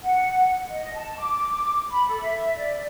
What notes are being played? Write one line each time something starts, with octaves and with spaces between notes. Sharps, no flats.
F#5
D#5
A5
D6
B5
A4
E5
D5